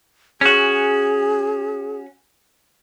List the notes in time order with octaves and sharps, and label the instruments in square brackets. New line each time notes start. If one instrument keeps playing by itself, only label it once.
[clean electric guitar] C#4 F#4 [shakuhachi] G#4